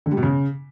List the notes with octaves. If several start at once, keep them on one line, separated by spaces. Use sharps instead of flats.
D3
G3
B2
C#3